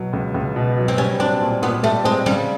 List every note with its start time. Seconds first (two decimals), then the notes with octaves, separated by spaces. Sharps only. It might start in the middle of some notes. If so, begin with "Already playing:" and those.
Already playing: B2 F#3
0.13 C#2
0.34 C#2
0.56 B2
0.78 F#3
0.88 C4
0.98 G3 C#4
1.20 C4 D4
1.42 A#2
1.62 A#2 B3
1.83 G3 A3
2.05 G#3 C4
2.26 C#3 G3